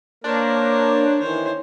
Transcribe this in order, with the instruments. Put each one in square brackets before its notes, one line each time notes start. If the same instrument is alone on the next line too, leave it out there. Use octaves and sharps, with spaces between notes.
[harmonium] A#3 A#4 [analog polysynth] D4 [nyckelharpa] C5 C#5
[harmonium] D#3 E3 [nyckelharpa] C5 C#5